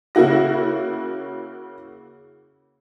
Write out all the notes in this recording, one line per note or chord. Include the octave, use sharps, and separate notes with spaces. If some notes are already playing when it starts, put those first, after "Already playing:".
C#3 A#3 E4 F#4 A#6